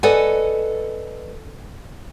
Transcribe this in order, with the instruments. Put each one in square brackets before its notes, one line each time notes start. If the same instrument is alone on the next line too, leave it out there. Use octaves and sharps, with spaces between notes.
[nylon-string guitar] A4 B4 D5 D#5 F#5 G#5